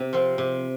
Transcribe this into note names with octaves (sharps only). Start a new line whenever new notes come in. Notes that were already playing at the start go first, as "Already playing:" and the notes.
Already playing: C3
F3 C4
C3